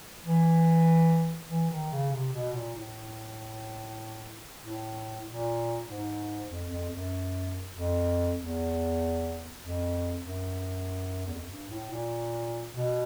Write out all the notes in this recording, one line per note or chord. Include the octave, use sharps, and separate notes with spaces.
E3
E3
D#3
C#3
C3
B2
A#2
A2
A2
A#2
G#2
F2
F2
F#2
F2
E2
F2
F#2
E2
F2
F#2
G2
A2
A#2
B2